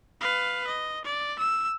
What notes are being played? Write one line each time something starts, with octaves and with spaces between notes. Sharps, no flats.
B4 F5
D#5
D5
E6